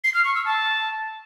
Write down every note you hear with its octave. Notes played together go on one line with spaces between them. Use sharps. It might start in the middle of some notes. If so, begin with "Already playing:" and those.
C7
F6
C#6
E6
A5